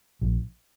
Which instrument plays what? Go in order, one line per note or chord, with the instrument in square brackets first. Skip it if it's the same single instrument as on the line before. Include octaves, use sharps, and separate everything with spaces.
[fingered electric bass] A#1